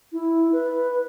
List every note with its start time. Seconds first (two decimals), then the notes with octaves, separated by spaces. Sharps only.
0.13 E4
0.52 B4